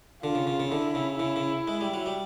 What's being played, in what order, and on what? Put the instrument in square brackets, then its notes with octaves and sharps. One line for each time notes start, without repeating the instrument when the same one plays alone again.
[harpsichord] D3 [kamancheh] F4
[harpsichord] C#3
C#3
C#3
[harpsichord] D3 [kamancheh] E4
[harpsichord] C#3
[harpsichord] C#3 [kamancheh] E4
[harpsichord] C#3
G#3
G3
F#3
G3